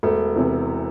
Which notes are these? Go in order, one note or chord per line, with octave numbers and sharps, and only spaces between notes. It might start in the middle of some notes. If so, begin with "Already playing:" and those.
E1 A3
E2 C3 E3